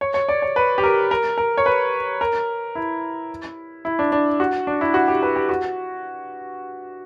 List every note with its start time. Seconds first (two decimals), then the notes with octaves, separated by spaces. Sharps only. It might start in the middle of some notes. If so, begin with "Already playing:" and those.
0.01 C#5
0.14 C#5
0.29 D5
0.42 C#5
0.56 B4
0.78 G4
0.84 A#4
1.11 A#4
1.38 A#4
1.58 C#5
1.66 B4
2.21 A#4
2.75 E4
3.85 E4
3.99 D4
4.12 D4
4.40 F#4
4.67 D4
4.81 E4
4.94 F#4
5.08 G4
5.23 B4
5.36 G4
5.49 F#4